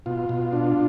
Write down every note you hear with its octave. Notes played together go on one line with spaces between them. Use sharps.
B2 F4
B2
D4